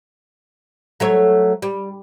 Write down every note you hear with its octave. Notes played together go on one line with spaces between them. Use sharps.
F#3 A3 C#5
G3